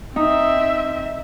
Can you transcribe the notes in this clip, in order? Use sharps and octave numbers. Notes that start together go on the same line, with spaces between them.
C4 D#4 E5